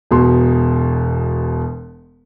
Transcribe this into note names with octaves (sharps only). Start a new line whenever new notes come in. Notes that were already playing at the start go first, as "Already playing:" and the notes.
E1 B2 C6